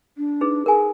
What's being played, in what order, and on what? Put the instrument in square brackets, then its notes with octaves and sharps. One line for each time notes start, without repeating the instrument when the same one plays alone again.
[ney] D4
[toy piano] D#4 G#4 B4
[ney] G#4 [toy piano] A#4 G#5